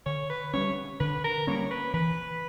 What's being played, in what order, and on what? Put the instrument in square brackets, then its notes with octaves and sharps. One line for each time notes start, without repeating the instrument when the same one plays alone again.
[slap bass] D3 [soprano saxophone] C#5
[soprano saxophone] B4
[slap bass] G3 A#3 C#4 [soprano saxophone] C#5
[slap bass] D3 [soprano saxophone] B4
[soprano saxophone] A#4
[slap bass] G3 A#3 C#4 [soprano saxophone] C#5
[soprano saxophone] B4
[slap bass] E3 [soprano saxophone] B4